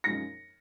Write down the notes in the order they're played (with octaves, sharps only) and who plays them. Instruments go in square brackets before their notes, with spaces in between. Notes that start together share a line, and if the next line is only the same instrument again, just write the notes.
[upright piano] F#2 F3 G#3 D#4 A#6 C#7